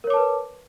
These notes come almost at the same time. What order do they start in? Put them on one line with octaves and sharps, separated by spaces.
A#4 C#5 D6 A5 B4